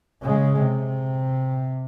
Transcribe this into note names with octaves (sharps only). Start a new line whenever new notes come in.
C#3 G#3
C3